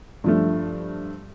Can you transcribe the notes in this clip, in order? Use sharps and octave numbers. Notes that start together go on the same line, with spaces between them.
G2 F3 A3